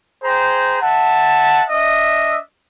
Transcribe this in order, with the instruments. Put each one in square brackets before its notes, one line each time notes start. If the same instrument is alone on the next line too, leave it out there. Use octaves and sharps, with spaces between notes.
[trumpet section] G#4 C5 G5 A#5
E5 F#5 A5
D4 D#5 E5